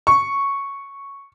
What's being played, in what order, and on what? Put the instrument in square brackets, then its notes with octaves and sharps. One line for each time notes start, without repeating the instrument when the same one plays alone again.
[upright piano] C#6